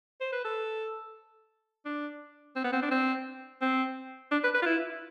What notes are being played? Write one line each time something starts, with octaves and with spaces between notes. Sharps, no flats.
C5
B4
A4
D4
C4
B3
C4
D4
C4
C4
D4
B4
B4
F4
E4